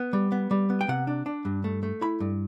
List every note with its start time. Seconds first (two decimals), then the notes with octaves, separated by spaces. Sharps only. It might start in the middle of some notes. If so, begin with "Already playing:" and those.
Already playing: B3
0.13 G3
0.32 B3
0.51 G3
0.70 B3
0.81 G5
0.88 C3 F#5
1.07 D4
1.26 D4
1.45 G2
1.64 A3
1.83 A3
2.01 E4 B5
2.20 G2